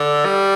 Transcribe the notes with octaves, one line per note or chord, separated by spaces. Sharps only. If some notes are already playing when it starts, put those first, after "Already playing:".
Already playing: D3
G3